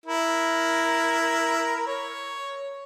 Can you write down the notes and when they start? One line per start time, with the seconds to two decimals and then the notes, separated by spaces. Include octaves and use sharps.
0.06 E4 A#4
1.87 C#5